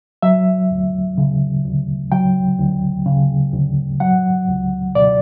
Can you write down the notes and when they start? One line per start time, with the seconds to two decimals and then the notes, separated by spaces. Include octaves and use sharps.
0.22 F#3 E5
0.71 D2
1.18 C#3
1.65 D2
2.12 F#3 G5
2.60 D2
3.06 C#3
3.53 D2
4.00 F#3 F#5
4.49 C#2
4.95 B2 D5